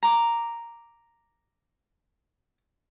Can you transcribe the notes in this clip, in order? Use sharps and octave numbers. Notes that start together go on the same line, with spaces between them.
A#5 D6